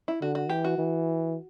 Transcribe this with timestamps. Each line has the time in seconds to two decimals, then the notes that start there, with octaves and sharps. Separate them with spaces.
0.08 E4
0.21 D3 F#4
0.35 F#4
0.49 E3 G4
0.64 F#4
0.78 E3